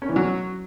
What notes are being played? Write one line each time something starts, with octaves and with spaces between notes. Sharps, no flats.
C#4
E3
F#3